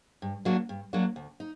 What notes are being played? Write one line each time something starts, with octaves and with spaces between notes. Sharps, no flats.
G2
F#3 A#3 D4 F#4
G2
F#3 A#3 D4 F#4
D2
D#4